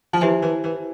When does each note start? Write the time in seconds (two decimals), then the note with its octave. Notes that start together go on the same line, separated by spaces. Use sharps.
0.13 F3
0.21 E3 E4 G4 C5 E5 G#5
0.42 E3
0.64 E3